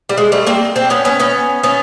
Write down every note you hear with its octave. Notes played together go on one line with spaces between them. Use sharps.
G3
G#3
G3 A3
A#3 C4
C4 D4
B3 C#4
B3 C#4
B3 C#4
B3 C#4